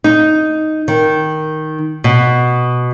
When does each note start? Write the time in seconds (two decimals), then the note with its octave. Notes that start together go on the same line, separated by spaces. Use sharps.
0.04 D#4
0.88 D#3
2.04 B2